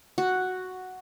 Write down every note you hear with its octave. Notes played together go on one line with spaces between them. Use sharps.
F#4